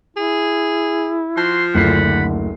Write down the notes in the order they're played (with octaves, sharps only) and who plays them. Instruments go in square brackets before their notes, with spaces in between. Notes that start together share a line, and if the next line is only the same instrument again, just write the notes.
[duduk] E4 [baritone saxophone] G#4
[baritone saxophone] F3 [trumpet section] F#4 C6
[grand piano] F#1 D2 C7 [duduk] D3 [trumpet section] G3 F#5 B5